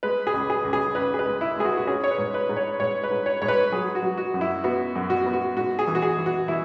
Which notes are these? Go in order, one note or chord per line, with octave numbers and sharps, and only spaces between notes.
G#3 B4
G#4
C#2
G#4
C#2
G#4
C#2 B4
G#4
B4
G#3
E4
G#3 G#4
F#4
F#4
C#4 G#4
C#5
B4
G#2
B4
G#2
C#5
G#2 C#5
B4
G#2
C#5
G#2 C#5
B4
F#3 G#4
F#4
F#3
F#4
F#2
E4
B3 F#4
F#2
F#4
B3
F#4
G#2 F#4
G#4
E3
F#4
G#4
E3
F#4
E3 E4